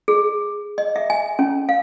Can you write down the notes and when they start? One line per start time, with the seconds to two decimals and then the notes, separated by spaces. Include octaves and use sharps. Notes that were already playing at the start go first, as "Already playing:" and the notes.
0.08 G#4
0.78 D#5
0.96 E5
1.10 G#5
1.39 C#4
1.69 F5